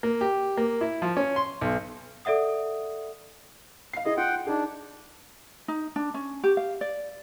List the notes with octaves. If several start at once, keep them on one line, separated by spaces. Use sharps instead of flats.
A#3
G4
A#3
E4
F3
C#4
C6
B1
A4 D5 E5 F#5 D#6
F5 C7
E4 G#4 D#5
F4 F#5 G5
D4 D#4 G#4
D#4
D4
C#4
G4
F5
D5